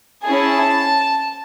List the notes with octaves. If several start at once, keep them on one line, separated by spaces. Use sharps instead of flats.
C#4 E4 G#4 A5